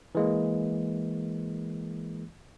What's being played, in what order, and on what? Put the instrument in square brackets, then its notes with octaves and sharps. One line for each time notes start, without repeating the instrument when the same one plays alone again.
[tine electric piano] E3 G#3 A#3